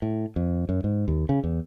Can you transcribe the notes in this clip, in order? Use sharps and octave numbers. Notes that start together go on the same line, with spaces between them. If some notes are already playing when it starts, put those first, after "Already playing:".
A2
F2
F#2
G#2
D#2
C#3
E2